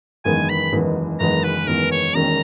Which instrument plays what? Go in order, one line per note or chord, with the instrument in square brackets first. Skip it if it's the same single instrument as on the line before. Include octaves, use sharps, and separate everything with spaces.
[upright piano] F#1 E2 D#3 G#3 B3 [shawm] G#5
[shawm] B5
[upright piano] F#1 E2 D#3 G#3 B3
[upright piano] F#1 E2 D#3 G#3 B3 [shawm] A#5
[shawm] B4
[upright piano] F#1 E2 D#3 G#3 B3 [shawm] A#4
[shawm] C#5
[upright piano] E1 D#2 D#3 A#3 C#4 [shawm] A#5